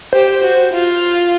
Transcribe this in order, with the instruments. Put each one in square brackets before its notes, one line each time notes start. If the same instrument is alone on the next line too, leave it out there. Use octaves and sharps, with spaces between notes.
[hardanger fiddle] G4 [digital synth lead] C5
[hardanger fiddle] F#4
F4